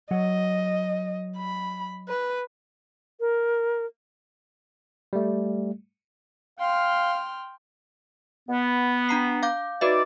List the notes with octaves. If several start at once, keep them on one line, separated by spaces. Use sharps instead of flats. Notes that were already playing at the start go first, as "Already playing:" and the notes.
F#3 D#5 F#5
B5
B4
A#4
G3 A3
F5 G5 C6 F6
B3
D4 A#5 C7
F5 D6 G6
D#4 F#4 B4 D5 E5